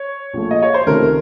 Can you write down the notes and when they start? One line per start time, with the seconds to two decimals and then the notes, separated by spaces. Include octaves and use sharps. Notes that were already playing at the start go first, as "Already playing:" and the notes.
Already playing: C#5
0.33 A#1 A#2 A3
0.51 D#5
0.63 C#5
0.74 C5
0.87 C#2 C3 D#3 A3 A#4